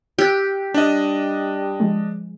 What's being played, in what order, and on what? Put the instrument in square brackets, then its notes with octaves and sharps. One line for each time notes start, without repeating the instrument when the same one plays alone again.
[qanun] G4 [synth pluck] E6 F#6 G6
[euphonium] G3 [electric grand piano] D4 D#5
[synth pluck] F3 G#3